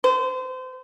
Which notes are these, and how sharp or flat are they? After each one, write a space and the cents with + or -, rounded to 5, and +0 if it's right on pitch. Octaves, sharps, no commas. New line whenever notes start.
C5 -30